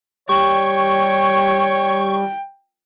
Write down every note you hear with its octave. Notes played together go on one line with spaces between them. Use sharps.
G3 C#5 G5 C#6